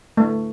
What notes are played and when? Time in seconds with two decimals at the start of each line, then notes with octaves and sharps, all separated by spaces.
0.17 A3